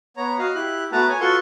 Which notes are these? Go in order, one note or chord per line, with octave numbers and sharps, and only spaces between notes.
B3 C#5 A#5
F#4 D#5 F5
E4 G4 F#6
A3 B3 F#4 B4 A5 A#5
C#5 G#5
F4 F#4 A4 B4 C6 C#6